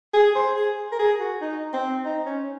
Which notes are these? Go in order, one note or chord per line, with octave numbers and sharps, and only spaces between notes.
G#4
C5
G#4
A#4
G#4
F#4
D#4
C4
D#4
C#4